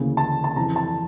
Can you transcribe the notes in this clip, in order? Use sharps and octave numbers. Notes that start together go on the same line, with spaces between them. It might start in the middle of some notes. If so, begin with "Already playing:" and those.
Already playing: D2 C#3 E3 A#3
A5
A5
F2 C#3 E3 A#5
A5